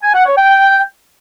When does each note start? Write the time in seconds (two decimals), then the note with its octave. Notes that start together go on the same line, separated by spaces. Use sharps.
0.03 G#5
0.14 F#5
0.26 C#5
0.38 G5